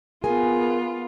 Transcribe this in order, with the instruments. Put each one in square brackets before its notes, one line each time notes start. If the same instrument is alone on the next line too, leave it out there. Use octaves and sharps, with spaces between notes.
[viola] B3 F4 [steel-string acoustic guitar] G#4 A#4 G#5